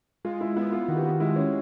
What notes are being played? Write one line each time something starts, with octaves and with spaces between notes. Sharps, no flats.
G#3 F4
E4
B3 E4
F4
D#3 F#4
G4
F#4
G#3 E4
C#4